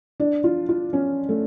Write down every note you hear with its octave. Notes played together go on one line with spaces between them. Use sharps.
D4
F4
F4
C#4
A3